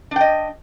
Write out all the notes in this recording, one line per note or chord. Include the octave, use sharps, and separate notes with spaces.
D4 D#5 G5